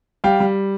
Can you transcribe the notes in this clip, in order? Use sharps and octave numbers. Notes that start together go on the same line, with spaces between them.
G3 F5 G5
G3